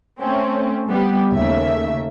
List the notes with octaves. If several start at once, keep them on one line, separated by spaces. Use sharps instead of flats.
A3 C4 C#4
G3 B3 G4
D#2 C#3 A3 A#3 E5